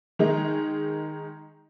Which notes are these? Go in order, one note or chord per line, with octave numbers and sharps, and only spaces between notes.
D#3 G#3 D#4